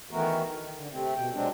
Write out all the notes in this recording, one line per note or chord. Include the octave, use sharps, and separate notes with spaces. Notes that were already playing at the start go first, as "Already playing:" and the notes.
D#3 E3 A3 B3 F#4 A#4
D#3
D3
C3 A3 C4
B2 G5
F#3 G#3 C4 D4